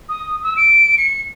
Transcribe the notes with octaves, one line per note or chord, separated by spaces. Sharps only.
D#6
E6
D7
C#7